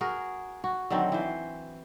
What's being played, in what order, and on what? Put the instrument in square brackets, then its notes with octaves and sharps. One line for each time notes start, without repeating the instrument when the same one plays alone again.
[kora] F#4 G#4 A#4
F#4
D3 D#3 F#3 C4
E3 C5